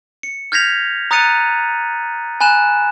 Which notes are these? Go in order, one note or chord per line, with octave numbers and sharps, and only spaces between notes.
C#7
F6 G6 G#6 A#6 B6 F7
A#5 D#6 F#6 A6 C#7 D#7
G#5 B5 F#6 E7